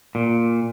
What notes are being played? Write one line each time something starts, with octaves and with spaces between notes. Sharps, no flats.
A#2